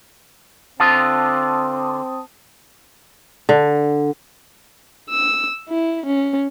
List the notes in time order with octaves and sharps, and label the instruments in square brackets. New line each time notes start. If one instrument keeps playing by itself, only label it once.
[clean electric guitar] D3 F4 [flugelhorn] C4 [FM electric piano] A5 D#6
[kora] D3
[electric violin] E6
E4
C#4